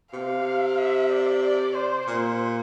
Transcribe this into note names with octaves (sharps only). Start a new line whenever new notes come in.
C3 F5
E5
D5
D5
C5
A#2 C5